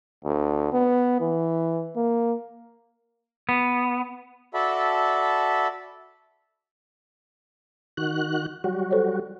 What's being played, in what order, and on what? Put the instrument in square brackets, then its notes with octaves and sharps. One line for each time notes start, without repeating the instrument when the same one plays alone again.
[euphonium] D2
B3
E3
A#3
[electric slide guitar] B3
[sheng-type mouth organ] F#4 A4 D5 E5 A5 B5
[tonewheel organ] D#3 F#4 F#6
F#3 G3 F#4
[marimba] A4 C5 C#5